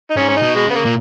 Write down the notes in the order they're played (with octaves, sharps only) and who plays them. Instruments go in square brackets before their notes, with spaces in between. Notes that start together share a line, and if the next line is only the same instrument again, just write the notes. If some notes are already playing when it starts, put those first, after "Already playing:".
[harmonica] D#4
[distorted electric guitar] G#2 [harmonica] C#4
[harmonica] C#4
D#4
[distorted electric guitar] B2
[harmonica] G#3
[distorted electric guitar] C#3 [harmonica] B3
[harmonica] A#3
[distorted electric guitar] A#2